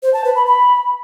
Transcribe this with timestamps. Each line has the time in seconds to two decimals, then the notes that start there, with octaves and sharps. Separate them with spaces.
0.03 C5
0.14 A5
0.25 B4
0.35 B5
0.46 B5